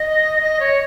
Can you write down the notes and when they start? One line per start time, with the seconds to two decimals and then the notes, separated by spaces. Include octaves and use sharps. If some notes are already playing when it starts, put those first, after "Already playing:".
Already playing: D#5
0.41 D#5
0.59 C#5